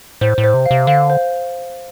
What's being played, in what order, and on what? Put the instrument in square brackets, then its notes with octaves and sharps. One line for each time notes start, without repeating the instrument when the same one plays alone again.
[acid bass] A2 [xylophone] C5
[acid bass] A2
[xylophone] C5
[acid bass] C3
[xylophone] F5
[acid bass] C3
[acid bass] D3 [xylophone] F5
[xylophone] C5